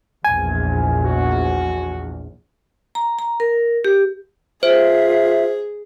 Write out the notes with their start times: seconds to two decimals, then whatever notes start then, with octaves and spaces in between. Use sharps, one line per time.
0.24 A#1 E2 G#5
1.04 F#4
2.95 A#5
3.19 A#5
3.40 A#4
3.85 G4
4.63 F4 G#4 C5 E5